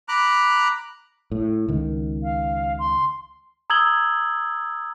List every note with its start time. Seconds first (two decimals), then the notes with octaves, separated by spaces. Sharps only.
0.09 A#5 B5 D6 F#6
1.32 A2
1.68 C#2 D#3
2.23 F5
2.79 C6
3.70 A#5 D#6 E6 G#6 F#7 G7